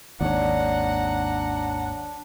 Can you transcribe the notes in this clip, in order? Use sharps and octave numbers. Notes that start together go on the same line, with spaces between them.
G#1 D#2 D4 C#5 D5 F#5 A#5